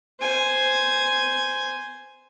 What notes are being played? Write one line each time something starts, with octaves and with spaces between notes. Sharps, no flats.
C5 G#5